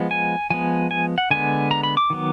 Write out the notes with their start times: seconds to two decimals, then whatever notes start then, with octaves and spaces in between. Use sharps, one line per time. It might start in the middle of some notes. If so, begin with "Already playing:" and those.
Already playing: F3 G#3 B3
0.11 G#5
0.50 F3 G#3 B3 G#5
0.91 G#5
1.18 F#5
1.31 D3 G#3 B3 G#5
1.71 A#5
1.83 B5
1.97 D6
2.10 D#3 F#3 B3